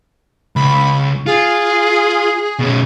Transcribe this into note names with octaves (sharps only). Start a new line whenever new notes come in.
C#2 B5
F4 G#4
B2 C#4